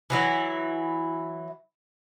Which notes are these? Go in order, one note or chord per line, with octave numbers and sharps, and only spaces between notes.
E3 F#3 E4